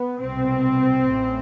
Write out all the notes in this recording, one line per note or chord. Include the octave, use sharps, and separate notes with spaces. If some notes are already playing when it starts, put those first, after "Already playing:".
Already playing: B3
C2 B2 C4
A1 A2